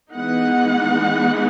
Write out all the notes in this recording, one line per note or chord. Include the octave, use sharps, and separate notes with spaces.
E3 G#3 B3 D#4 F#5